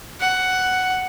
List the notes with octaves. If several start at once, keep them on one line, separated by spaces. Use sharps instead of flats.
F#5